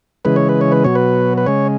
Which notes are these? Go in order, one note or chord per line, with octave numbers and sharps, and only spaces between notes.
C#3 E3 G#3 B4
C#5
B4
C#5
B4
B2 F#3 C#5
B4
B4
C#3 G#3 C#5